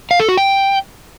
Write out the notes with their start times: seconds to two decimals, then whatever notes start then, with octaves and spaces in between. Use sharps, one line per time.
0.11 F5
0.20 A4
0.29 F#4
0.37 G5